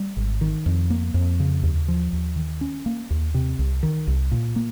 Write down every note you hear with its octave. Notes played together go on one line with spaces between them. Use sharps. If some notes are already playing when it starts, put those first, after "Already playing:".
Already playing: G3
G#1
D#3
F2
A#3
F2
C#3
D#2
F3
D#2
D#3
C#4
A#3
D#2
C3
C2
D#3
C2
A#2
A#3